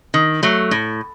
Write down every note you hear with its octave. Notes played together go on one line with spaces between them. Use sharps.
D#3
F#3 A3
A2